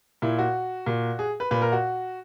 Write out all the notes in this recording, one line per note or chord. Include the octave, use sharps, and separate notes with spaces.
A#2 E4
F#4
A#2
G#4
B4
A#2 B4
A#4
F#4